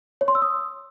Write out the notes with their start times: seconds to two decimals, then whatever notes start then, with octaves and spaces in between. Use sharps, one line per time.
0.21 C#5
0.28 C6
0.35 E6
0.42 D#6